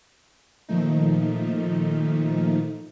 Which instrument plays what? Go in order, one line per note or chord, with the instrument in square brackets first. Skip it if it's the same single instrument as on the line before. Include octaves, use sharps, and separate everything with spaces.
[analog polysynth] A#2 D#3 F3 A3 D#4